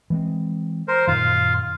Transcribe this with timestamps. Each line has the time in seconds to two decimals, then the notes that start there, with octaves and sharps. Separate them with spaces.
0.10 E3 G#3 C4
0.88 A#4 C5
1.07 F#2 A#2 D#3 F4 F5